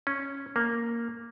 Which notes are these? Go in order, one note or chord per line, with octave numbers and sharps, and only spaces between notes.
C#4
A#3